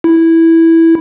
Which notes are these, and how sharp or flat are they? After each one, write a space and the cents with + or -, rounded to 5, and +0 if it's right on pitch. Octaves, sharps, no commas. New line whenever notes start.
E4 -5